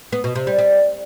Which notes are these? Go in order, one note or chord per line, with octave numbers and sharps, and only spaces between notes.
B3
B2
C3
G3
G3